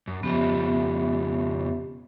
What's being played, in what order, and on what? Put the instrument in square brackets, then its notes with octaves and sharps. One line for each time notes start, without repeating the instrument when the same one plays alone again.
[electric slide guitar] F#2
[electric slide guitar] F2 C#3 F3 [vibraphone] B3 G4 E5